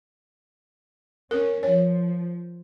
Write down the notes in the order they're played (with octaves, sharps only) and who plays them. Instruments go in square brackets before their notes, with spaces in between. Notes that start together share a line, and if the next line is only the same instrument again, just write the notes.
[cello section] C#4 [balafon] A#4
[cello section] F3 [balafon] C#5